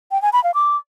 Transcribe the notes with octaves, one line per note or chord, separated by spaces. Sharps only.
G5
G#5
B5
F5
D6